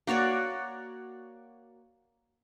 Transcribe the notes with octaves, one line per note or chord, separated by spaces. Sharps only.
A#3 F#4 C#5 D5